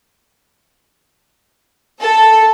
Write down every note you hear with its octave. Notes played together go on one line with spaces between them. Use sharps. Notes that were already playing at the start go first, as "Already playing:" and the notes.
A4